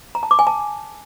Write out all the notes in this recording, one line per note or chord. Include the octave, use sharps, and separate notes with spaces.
A#5
A5
D6
G#5
A5